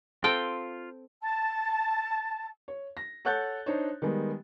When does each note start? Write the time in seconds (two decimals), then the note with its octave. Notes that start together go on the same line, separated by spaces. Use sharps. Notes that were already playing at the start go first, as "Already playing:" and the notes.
0.24 C4 F4 A4 G5
1.22 A5
2.68 C#5
2.97 A#6
3.25 A4 C#5 F#5 F#6 G6 A6
3.66 D4 D#4 C5 C#5
4.02 D#3 G3 G#3 B3